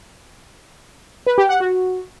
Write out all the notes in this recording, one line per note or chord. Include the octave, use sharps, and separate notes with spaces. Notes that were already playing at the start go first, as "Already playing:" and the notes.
B4
G4
F#5
F#4